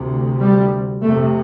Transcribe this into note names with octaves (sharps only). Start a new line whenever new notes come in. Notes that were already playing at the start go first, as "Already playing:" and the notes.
Already playing: D2 C3
G3
F2 C3 A3